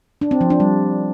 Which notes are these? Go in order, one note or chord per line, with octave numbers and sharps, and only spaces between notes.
D4
C4
F3
D4
G3